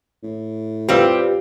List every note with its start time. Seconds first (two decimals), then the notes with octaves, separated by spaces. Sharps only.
0.23 A2
0.89 G3 C4 F4 G4 B4 F5